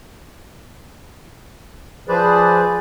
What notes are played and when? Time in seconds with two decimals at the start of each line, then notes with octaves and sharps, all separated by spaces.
2.08 F3 G#4 B4 C5 D5